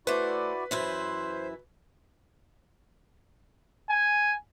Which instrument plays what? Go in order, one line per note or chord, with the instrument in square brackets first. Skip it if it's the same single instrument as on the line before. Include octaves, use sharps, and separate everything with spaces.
[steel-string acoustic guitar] A3 C5 [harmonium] E4 F#4 D5 [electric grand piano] B4
[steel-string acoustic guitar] F#2 E3 E4 [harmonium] C5
[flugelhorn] G#5